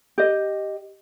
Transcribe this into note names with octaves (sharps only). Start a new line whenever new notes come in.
G4 D#5